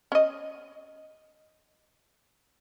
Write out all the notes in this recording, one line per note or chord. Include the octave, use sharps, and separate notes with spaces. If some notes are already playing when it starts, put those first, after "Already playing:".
C#4 D#5